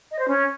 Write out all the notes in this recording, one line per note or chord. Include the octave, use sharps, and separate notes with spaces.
D#5
C5
C#4